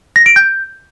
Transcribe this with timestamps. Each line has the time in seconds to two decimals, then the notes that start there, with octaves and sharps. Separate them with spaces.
0.16 A#6
0.26 D7
0.36 G6